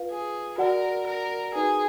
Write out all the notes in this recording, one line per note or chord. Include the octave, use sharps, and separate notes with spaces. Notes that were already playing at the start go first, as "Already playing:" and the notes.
Already playing: F4 B4 F5
G#4
F#4 A#4 D5 F#5
A#4
D#4 F#4 G#4 B4